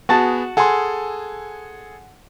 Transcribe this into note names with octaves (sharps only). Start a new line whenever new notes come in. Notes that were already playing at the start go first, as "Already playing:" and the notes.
B3 F#4 G#4 A5 A6
G#4 A4 F#5 G#5 C6